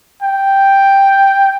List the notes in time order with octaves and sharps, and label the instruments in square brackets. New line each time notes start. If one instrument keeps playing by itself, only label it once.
[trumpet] G5